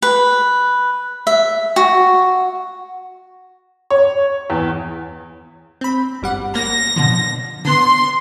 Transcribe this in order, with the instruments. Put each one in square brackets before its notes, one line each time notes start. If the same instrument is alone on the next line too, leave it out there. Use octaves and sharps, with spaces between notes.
[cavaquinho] B4
E5
F#4
[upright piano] C#5
E2
[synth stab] C4 B5
G1 G3 F#5
[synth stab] A#3 [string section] A#6
[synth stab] B2 D3 F3
[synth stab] D3 B3 [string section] C6